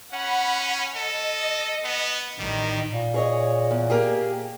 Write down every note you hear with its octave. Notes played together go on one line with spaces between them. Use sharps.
C#4 F#5 B5
A4 D#5
B3
A1 D#3 G3
A#2
G#4 C#5 D#5
E2
A#3 G4 G#4